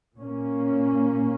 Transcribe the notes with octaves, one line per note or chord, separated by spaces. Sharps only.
A#2 A#3 C#4